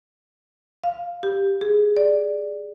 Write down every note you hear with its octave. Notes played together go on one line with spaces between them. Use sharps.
F5
G4
G#4
D5